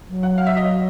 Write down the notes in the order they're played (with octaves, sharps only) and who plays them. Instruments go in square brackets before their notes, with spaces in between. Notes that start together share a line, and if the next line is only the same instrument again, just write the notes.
[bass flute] F#3
[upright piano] F#5
F5
E5
D#5